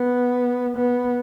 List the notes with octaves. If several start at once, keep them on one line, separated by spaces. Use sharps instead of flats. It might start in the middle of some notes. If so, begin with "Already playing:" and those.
Already playing: B3
B3